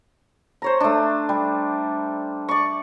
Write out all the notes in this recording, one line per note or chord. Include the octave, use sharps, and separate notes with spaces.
C5 C#5 A#5
A3 D4
G3
D5 C#6